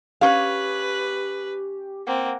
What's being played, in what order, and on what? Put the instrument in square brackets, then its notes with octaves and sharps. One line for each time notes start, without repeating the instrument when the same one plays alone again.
[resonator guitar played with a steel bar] C#4 F5 [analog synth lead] G4 [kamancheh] B4
[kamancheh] A#3 C4 [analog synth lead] F#5